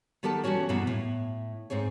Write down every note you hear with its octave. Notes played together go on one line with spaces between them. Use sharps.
D#3 B3 G4 A4 A#4 A5
E3 G3 C#4 F#4 C#5
E2 G2 B2 E3 A#3 B3
A2
G#2 C4 G#4 C#5